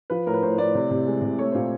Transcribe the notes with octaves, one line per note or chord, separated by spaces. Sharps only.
F3 B4
A2 A#4
B4
A2 C5
A2 D5
C3
C3
G#3
C3
A3 C#5
A#2 C5